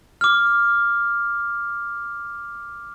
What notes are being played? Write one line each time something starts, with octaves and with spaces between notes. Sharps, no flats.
D6 F6